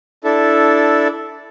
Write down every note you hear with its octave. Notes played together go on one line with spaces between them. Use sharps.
D4 E4 A4